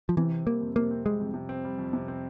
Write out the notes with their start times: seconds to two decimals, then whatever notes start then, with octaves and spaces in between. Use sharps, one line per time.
0.09 F3
0.17 C3 E3
0.32 C4
0.47 G3 A#3
0.61 F2
0.76 C3 A#3
0.91 C4
1.05 G3 G#3
1.20 F2
1.34 C3
1.49 C4
1.64 G3
1.78 F2
1.93 C3
2.08 C4